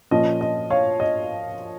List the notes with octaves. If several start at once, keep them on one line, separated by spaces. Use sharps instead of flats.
A#2 F3 C#4 D#5
D#5
C#5 F5
D#5